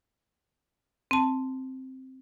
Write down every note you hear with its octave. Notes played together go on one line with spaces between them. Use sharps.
C4 A5